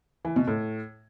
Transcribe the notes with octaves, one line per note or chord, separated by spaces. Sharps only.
E3
B2
A2